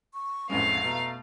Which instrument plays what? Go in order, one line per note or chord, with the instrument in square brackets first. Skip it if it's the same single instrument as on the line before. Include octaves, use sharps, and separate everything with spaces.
[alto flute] C#6
[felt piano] A1 F2 G#3 [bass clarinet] A3 [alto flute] C#4 [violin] F5
[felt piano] B2 [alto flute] A#5